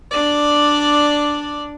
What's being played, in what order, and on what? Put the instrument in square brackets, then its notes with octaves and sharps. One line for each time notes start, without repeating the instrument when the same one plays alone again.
[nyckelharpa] D4 D5